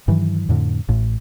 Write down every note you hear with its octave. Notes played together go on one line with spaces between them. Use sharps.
G2 D#3 E3 F#3
F2 A2 D3
A1 A2